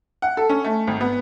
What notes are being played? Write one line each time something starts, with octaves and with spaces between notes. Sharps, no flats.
F#5
A4
C#4
A3
G#1
B3